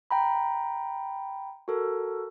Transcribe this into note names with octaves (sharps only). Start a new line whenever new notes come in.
G5 A#5 B5
F#4 A4 A#4